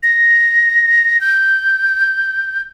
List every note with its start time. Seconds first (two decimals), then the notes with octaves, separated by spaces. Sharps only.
0.03 A#6
1.21 G6